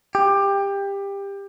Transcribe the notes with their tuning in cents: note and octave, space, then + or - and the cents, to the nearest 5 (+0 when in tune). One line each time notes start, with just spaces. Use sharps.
G4 +20